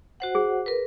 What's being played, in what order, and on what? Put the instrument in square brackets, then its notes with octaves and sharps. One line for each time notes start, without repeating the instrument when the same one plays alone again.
[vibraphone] F#4 C5 F#5
[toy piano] G#4
[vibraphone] A#4 B4